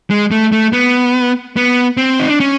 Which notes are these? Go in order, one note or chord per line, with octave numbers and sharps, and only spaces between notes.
G#3
A3
A3
B3
B3
C4
D#4
D4
C#4